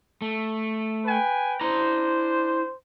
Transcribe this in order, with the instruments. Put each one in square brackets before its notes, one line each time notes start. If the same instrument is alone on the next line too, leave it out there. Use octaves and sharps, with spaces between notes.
[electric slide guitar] A3
[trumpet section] B4 G5 G#5
[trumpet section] D4 C5 [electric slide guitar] E4 A#5